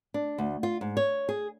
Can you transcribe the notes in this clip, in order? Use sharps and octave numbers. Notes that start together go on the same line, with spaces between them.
D4
D2
F4
G#2
C#5
G#4